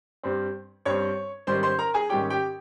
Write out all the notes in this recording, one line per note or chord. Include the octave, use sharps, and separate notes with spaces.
G2 G3 C4
G2 G3 C4 C#5 C#6
G#2 D#3 G3 C#4 C5 C6
C5 C6
A#4 A#5
G#4 G#5
G#2 D#3 G3 C#4 G4 G5
G4 G5